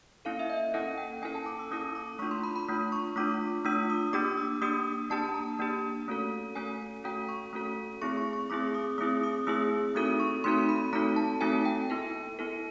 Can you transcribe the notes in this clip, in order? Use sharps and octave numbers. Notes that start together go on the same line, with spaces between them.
A#3 C#4 E4 A4 F5
E5
D#5
A#3 C#4 E4 A4 F#5
G5
A#3 C#4 E4 A4 G#5
A5
D6
E6
A#3 C#4 E4 A4 D#6
D6
A3 D4 F4 C#6
C6
B5
B5
A3 D4 F4
C#6
A3 D4 F4 D6
A3 D4 F4 E6
D#6
A#3 D4 G4 D6
E6
A#3 D4 G4 D#6
A#3 D4 G4 A5
A#5
A#3 D4 G4
A3 C#4 F#4 A4
A3 C#4 F#4 A4 G#5
A3 C#4 F#4 A4 G5
C#6
A3 C#4 F#4 A4
A3 C4 E4 G#4 C#6
C#6
C#6
A3 C4 E4 G#4 D6
D#6
A3 C4 E4 G#4 D#6
D#6
A3 C4 E4 G#4 E6
A3 C4 D#4 F#4 A4 D#6
C#6
A3 C4 D#4 F#4 A4 C6
B5
A3 C4 D#4 F#4 A4 A#5
A5
A3 C4 D#4 F#4 A4 G#5
G5
B3 E4 A4
B3 E4 A4